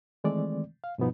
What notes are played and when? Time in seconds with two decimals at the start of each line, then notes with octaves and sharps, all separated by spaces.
0.24 D#3 E3 G#3 A3 C4 D5
0.84 F5
0.98 G2 B2 F3 B3 D#4